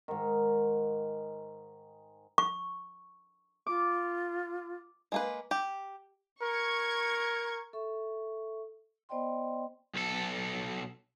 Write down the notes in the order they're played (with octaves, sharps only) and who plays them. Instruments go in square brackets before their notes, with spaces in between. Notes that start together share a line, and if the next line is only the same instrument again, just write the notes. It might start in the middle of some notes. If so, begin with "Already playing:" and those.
[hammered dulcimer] G#2 D#3
[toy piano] C#6
[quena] F4 [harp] D6
[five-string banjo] G#3 A#3 B4
G4
[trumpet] A#4 [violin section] C#6 G#6
[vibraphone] A4 E5 C#6
B3 C5 D5 D#5 G5 C6
[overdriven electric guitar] B1 A4